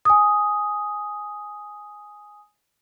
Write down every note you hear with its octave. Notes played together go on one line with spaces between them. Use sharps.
G#5 D#6